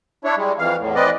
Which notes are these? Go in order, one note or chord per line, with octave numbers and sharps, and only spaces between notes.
D4 E4 C#5
G3 G#3
F2 E3 F5
E2 A2
E3 C4 B4 D5 D#5